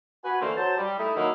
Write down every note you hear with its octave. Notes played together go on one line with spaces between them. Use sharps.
F#4 B4 G#5
D3 E3 A3 A#3 C5
F#3 C5 A5
G3
A3 D#4 E4
D#3 F#3 G#3 A#3 D#4 E4